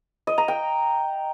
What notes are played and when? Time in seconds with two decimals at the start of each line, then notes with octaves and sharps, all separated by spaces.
0.27 D#5
0.38 A#5
0.48 G5